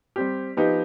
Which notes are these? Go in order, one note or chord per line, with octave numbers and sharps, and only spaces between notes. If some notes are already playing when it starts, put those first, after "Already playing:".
G3 C4 G4
F3 B3 D#4 G4